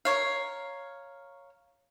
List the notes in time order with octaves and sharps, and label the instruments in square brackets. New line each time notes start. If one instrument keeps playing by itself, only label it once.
[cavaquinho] A#4 C#5 F5